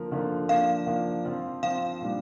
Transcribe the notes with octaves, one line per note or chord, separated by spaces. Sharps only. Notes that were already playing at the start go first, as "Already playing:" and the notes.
Already playing: D3 F3 A#3 F4 A#4
D3 F3 A#3 F4 A#4
F3 A#3 D4 F5
F3 A#3 D4
F3 C4 F4 C5
F3 C4 F4 C5 F5
A#2 G3 D4